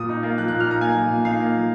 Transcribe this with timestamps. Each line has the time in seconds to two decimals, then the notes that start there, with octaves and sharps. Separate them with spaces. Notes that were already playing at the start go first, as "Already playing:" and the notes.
Already playing: A#2 D#6
0.09 D#4
0.23 A#3
0.38 F3 F#6
0.48 F#6
0.52 A#2
0.60 F6
0.67 D#4 A#5
0.81 A#3 G#5
0.96 F3
1.11 A#2
1.25 D#4 F5
1.40 A#3
1.55 F3